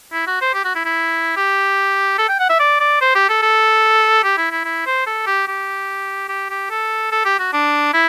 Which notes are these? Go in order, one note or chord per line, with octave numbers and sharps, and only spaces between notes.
E4
F#4
C5
G4
F#4
E4
E4
G4
A4
G5
F#5
E5
D5
D5
C5
G4
A4
A4
G4
E4
E4
E4
C5
A4
G4
G4
G4
G4
A4
A4
G4
F#4
D4
E4